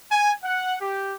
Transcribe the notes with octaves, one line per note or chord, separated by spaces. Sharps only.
G#5
F#5
G4